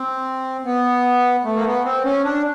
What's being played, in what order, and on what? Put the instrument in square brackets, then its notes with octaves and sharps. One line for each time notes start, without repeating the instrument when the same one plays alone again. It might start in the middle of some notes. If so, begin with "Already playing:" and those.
Already playing: [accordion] C4
B3
A3
A#3
B3
C4
C#4
D4